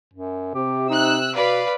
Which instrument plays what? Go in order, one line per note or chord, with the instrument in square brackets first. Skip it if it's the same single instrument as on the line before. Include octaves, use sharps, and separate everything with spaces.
[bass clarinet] F#2
[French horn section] C3 [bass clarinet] G4
[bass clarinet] D#4 [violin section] E6 F#6
[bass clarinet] B2 [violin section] B4 D5 F5